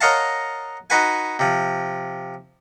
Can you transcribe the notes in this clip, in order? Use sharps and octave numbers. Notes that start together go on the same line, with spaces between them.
A#4 C#5 D#5 F5 F#5 A5
D#4 F#4 B4 F#5 G#5
C3 F3